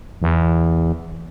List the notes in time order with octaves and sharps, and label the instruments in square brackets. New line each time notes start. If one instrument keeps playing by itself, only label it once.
[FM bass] E2